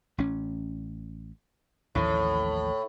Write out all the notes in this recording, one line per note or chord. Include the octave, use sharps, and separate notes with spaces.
A1 C#4
A1 D#2 A2 F3